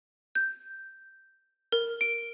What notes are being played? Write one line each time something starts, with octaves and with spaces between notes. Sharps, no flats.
G6
A#4
D7